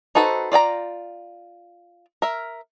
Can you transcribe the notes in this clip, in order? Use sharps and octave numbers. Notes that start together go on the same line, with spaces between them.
D#4 F#4 A4 B4 C5
F4 D5 G5 A#5
A#4 E5